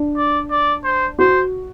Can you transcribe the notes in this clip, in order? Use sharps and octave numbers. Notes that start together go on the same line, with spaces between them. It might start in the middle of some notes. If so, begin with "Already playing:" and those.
Already playing: D4
D5
D5
C5
F#4 C5